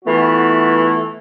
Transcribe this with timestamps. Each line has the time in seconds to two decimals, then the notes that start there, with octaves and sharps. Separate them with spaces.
0.05 E3 A3 B3 F4 F#4